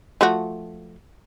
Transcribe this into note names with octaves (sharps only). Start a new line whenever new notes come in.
F3 A3 F#4